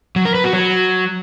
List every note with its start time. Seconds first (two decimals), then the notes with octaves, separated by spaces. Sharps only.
0.16 F#3
0.25 A#4
0.35 B4
0.44 F#4
0.53 F#3